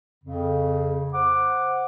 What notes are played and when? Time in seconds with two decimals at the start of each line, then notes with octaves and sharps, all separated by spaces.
0.24 F2 C#3
1.13 C5 F#5 D6